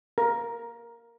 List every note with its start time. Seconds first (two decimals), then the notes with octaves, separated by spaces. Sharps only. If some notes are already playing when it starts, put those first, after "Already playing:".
0.18 A#4